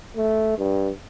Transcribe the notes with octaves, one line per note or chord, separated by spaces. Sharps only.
A3
G2